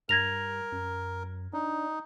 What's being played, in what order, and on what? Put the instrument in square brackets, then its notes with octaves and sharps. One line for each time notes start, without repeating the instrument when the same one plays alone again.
[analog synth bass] G2 [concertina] A#4 [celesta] G#6 A#6 F7
[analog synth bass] F#2
[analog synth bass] D4 [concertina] D#4